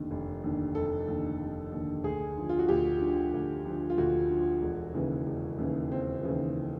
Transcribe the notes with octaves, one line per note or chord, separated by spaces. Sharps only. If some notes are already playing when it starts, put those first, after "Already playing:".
Already playing: F1 D#2 D3
F1
D#2 D3
F1 A4
D#2 D3
F1
D#2 D3
D2 G#4
D3 F3
F4
F#4
D2 G4
D3 F3
D2
D3 F3
F4
D2 F#4
D3 F3
E1
D#2 C#3 E3
E1
D#2 C#3 E3
E1 C4
D#2 C#3 E3